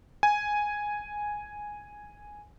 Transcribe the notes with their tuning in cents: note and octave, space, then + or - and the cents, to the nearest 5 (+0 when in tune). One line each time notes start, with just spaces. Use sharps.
G#5 +0